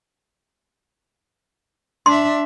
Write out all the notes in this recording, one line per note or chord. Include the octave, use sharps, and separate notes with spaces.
D4 E5 C6